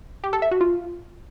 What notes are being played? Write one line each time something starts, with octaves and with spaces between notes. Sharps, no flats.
G4
A4
E5
F#4
F4